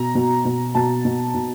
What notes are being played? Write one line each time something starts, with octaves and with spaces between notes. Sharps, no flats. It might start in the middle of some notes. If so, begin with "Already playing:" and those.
Already playing: B2 A#5
B2
B2
B2 A5
B2
B2